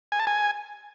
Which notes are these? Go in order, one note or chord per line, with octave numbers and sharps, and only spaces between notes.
G#5
A5
G#5